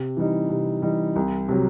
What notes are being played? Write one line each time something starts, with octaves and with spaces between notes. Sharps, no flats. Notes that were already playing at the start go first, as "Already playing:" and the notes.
Already playing: C3
E3 G3 D#4
C3
E3 G3 D#4
C2
C3 F#3